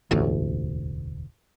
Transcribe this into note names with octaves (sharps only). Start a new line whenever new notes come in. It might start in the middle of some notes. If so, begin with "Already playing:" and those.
E1 A1 D2